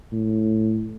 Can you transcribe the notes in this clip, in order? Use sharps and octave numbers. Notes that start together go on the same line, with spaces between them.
A2